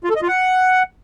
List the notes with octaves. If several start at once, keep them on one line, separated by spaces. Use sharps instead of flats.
F4
A4
D#5
F4
F#5